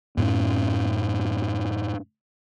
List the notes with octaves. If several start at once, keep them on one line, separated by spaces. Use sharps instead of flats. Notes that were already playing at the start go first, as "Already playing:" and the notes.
F#2 A2 C4 C#4